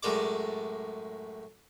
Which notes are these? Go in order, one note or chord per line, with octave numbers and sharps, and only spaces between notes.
F#2 A2 G#3 D5 D6